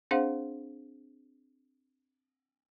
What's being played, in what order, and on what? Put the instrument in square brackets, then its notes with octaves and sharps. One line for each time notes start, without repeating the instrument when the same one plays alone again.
[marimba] C4 D4 G#4 C5 F5 F#5